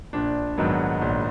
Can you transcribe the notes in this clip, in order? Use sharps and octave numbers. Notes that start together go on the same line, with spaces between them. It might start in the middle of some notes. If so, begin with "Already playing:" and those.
A#1 D4
G#2 D#3 F#3 B3
A#1